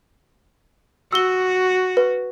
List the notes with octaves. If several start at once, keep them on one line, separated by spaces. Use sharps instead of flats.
F#4 E6 G7
B4